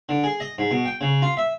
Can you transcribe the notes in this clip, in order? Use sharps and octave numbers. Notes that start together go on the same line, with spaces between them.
D3
G#4
D#5
G#2
B2
G5
C#3
F4
E5